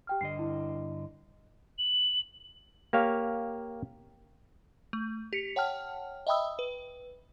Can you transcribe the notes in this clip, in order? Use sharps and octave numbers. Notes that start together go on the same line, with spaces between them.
G4 G5 F6
G2 D3 D#5 C7
E4
F#7
A#3 G4 C#5 F5
A3
G4 B6 C#7
C#5 F#5 G5 A5 F6
D#5 E5 G5 B5 D#6 E6
B4